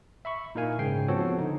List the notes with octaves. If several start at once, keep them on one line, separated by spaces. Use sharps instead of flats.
E5 B5 C#6
A#2 D#4 E4 A#4 F5 G#5
G#2 C#3 G5 C7
F3 B3 C4 F#4 A4 C#5
D3 D#4